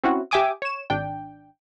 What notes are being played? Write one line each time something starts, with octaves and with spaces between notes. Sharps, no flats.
C4 C#4 E4 F#4
G4 E5 G5 G#5 D6 D#6
C#5 E7
G#1 D4 G5